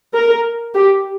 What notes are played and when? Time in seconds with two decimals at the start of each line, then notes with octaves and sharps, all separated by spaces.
0.14 A#4
0.75 G4